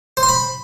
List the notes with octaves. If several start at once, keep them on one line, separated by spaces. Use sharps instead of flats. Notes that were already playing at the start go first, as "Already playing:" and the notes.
C5
C6
B5